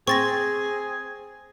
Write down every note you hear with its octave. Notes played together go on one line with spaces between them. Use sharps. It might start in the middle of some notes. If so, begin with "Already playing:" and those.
C4 G#4 C#6 A6 A#6